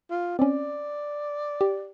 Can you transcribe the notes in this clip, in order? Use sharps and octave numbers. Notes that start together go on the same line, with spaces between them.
F4
C4 C#4 D5
G4